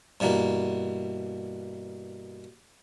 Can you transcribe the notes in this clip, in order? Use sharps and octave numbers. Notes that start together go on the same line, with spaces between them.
G2 B2 E3 A#3